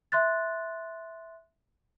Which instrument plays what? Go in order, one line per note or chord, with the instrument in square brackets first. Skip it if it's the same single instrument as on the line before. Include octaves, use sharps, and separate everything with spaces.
[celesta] E5 C6 F#6 A6